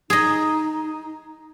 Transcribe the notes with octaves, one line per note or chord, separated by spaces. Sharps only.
D#4 G#4 D#5